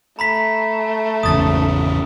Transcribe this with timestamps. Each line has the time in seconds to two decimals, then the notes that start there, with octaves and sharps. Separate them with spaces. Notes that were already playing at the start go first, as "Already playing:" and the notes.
0.19 A3 A#5 B5 B6
1.23 G#1 E2 C#3 D#6 A6